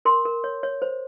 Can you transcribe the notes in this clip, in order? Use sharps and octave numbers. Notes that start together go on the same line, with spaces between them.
A#4 C6
A#4
C#5
C#5
C5